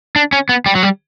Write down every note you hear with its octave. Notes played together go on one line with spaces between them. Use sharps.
D4
C#4
B3
G3
F#3
G3